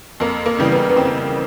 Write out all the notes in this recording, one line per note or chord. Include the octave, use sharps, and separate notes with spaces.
F2 A#3
A#3
C#3 E3 G3
B3
B3
F2 C4